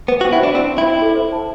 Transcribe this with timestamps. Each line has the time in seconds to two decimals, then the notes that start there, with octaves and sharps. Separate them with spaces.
0.08 B3 C5
0.21 F#4
0.24 G5
0.33 E4
0.40 D4 C5
0.55 C4 C6
0.71 C5
0.78 E4
0.86 G5
1.02 A4
1.16 C5
1.32 A5